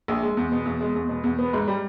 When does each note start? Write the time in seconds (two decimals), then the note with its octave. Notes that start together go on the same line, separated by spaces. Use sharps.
0.08 A#1
0.23 G#3
0.37 E2
0.52 B2
0.66 E2
0.80 G#3
0.95 E2
1.09 B2
1.24 E2
1.39 B3
1.53 G#2
1.68 G3